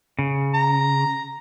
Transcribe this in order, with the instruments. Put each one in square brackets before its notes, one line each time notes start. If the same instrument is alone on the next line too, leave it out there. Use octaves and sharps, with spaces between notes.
[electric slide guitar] C#3
[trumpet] A#5